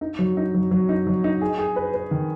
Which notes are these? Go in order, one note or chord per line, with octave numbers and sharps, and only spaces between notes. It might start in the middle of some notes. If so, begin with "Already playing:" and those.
D#4
F#3
D#4
F#3
F#3
D#4
F#3
D#4
G#4
G#4
B4
B4
D#3